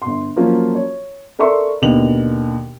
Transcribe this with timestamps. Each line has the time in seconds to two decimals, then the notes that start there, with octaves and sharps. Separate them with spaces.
0.02 G1 C6
0.36 F3 F#3 A#3 C#4 F4 F#4
0.75 C#5
1.39 A4 A#4 D5 E5 C6 C#6
1.82 D#2 B2 D3 D#5 F7 F#7